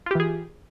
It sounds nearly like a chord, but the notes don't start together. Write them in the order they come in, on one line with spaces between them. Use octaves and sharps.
F4 G4 E3 G#4